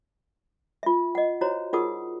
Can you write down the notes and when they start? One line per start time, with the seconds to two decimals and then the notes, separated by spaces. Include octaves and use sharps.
0.83 F4 E5
1.15 D#5 F#5
1.41 E4 F#4 C5 C#5 A#5
1.73 D#4 F4 G#4 A#4 F#5 D#6